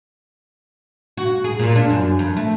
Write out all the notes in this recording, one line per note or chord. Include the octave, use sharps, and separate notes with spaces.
F#4
G#4
A#2
D4
F#2
F2
A3